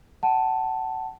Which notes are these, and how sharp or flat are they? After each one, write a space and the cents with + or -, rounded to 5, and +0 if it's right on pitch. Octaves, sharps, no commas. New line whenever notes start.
F#5 +30 A5 +0